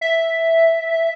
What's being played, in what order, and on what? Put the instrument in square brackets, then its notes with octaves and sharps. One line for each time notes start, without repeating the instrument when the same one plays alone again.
[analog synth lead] E5